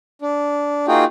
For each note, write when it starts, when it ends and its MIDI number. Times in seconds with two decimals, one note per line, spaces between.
0.22 0.86 62
0.88 1.05 58
0.88 1.05 63
0.88 1.05 65
0.88 1.05 66
0.88 1.05 68
0.88 1.05 79